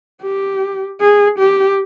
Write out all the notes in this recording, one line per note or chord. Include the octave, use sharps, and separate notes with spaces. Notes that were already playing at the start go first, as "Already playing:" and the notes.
G4
G#4
G4